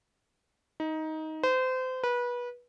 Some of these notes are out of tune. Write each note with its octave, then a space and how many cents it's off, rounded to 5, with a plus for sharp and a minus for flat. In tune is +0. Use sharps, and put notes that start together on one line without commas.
D#4 +15
C5 -30
B4 -25